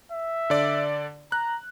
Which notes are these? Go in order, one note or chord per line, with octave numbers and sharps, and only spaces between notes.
E5
D3 D5
A#5 F#6